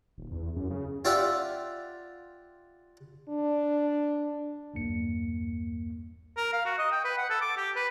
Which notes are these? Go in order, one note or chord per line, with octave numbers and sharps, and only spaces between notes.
D#1
E2
F#2
C#3
F4 G4 D5 E5 F#5
D4
B1 E2 G2 A#3 C#7
A#4
F5
F#4
D#5
G5
B4
F#5
A4
D6
G4
B4